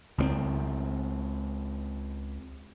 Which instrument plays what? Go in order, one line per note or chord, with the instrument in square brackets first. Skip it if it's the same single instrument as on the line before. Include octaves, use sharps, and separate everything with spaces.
[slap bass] C#2 A3 C4